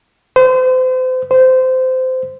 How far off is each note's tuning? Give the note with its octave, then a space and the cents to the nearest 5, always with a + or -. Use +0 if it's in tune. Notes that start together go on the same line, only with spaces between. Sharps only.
C5 -35
C5 -20